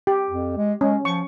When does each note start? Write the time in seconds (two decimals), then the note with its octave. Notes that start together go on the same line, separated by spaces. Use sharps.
0.07 G4
0.30 F2
0.57 G#3
0.81 G#3 C#4
1.05 F3 C#6